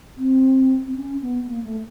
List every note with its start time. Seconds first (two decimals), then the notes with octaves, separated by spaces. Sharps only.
0.17 C4
0.87 C4
0.96 C#4
1.21 B3
1.47 A#3
1.64 A3